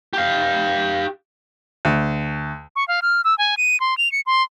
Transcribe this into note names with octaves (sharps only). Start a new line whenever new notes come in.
G4 F5
D2
C#6
F5
F6
E6
G#5
D#7
C6
F7
C#7
C6